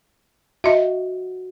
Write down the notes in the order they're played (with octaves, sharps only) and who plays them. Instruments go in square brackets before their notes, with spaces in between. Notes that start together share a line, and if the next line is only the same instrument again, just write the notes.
[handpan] F#4 [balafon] D#5 E5